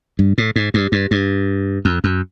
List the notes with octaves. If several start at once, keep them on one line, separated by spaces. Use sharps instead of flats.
G2
A2
G#2
G2
G2
G2
F2
F#2